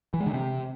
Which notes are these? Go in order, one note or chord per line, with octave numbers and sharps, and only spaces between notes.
E3
G#3
D3
C3